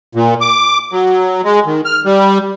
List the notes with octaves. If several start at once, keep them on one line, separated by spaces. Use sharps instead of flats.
A#2
D6
F#3
G#3
D#3
F6
G3